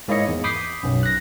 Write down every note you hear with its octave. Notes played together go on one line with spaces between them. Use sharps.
G#2 A#3 E4 C#5 D#5 C#7
E2
B5 D6 D#6 G6 B6 C7
B1 F#2
F#6 A#6